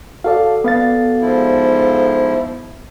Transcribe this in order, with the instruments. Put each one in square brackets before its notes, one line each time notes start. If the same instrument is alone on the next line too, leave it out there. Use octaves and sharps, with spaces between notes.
[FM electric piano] F#4 A4 D5 [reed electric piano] F5
[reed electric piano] B3 F5 A6
[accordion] G#2 F3 E4